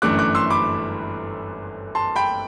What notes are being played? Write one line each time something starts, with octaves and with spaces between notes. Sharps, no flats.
G1 F#2 E3 A3 D4 D6 F#6
D6 F#6
C6 E6
B5 D6
A5 C6
G5 B5